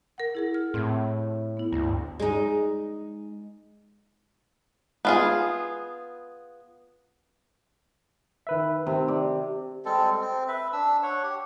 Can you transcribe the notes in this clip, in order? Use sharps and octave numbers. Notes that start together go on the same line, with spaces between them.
A#4 F#5
E4 G#4 A#4
F6
A2 C4 G#6
B3 E4
D2 G2
G#3 D#4
B3 F4 G#4
D#3 B4 E5
C3 D#3
D5
G3 G#3 C4 A4
C4
B4 E5
D4 E6
C#5 F#5
G4